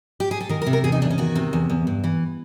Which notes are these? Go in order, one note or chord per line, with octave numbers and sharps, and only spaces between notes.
G4
G#4
A4
D#3 A#4
A#4
C3
A#4
E2 G#4
D#4
E2 D4
C#4
D#3 F#4
C3
E2
E2
G2
E3